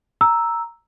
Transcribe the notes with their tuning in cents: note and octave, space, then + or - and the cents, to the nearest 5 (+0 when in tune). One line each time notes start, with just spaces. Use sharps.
A#5 +0 E6 +0